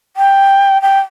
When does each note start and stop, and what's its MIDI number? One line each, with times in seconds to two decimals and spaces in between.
0.16 0.81 79
0.82 1.00 79